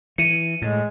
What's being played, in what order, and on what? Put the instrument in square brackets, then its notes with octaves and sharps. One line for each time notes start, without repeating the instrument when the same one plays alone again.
[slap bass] E3 [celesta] C#7 D#7
[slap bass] A2 [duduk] G#3